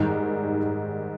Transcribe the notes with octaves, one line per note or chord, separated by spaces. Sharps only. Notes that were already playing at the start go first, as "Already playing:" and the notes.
Already playing: G#2 D#3 G3